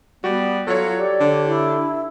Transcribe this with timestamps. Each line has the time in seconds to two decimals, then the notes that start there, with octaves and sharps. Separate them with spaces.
0.24 G3 B3 F#4
0.67 F#3 F4 A4 C#5
0.98 G4 D5
1.20 D3
1.46 E4